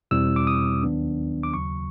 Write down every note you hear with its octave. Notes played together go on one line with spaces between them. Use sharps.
E2 B2 G3 C4 E4 E6
D6
D#6
D#2 D#3 F#3 B3 D4
D6
D#2 C#3 F#3 C#6